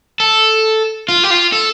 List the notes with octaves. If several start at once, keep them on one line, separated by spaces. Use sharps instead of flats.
A4
F4
G4
F4
A4